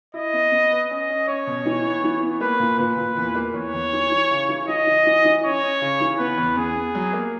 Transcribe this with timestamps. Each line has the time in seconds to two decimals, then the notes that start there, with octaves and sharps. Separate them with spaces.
0.14 E4 D#5
0.33 B3
0.52 B3
0.71 B4
0.90 C#4 D#5
1.09 C#4
1.27 C#4 C#5
1.47 B2
1.65 E3
1.84 B3
2.04 E3
2.23 B3
2.40 A#3 B4
2.60 A#2
2.79 A#2 B4
2.97 A#2
3.17 E2
3.35 A#3
3.54 E2 C#5
3.74 E2
3.93 E3
4.11 E3
4.31 C#3
4.49 E3
4.68 E3 D#5
4.86 E3
5.06 E3
5.25 E3
5.44 C#4 C#5
5.63 C#4
5.81 C#3
6.00 E3
6.19 B3 B4
6.38 E2
6.57 B3 G#4
6.76 B3
6.95 F#3
7.13 A#3